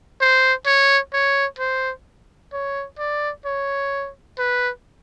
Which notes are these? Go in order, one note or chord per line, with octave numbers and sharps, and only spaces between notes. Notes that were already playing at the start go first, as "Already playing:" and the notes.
C5
C#5
C#5
C5
C#5
D5
C#5
B4